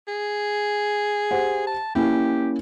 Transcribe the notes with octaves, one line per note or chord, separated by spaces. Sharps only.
G#4
G4 C5 F#5
A5
A#3 C#4 E4 G4